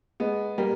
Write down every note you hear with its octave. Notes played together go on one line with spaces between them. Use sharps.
G#3 B3
G3 A#3